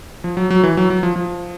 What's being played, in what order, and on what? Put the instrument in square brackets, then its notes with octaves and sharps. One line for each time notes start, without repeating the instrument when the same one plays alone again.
[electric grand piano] F3
F#3
F#3
E3
F#3
F#3
F3
F3